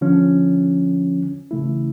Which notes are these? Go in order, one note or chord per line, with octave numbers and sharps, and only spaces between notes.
D3 F3 C#4
C#3 E3 A3 E4